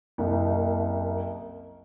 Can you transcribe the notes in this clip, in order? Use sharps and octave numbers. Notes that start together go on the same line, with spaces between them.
F#1 C2